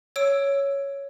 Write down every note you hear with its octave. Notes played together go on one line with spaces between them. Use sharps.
C#5 E6 D7